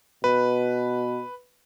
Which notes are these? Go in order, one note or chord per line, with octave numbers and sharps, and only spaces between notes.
B2 B4